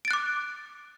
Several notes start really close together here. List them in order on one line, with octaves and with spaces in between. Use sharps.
D7 A6 F#6 D6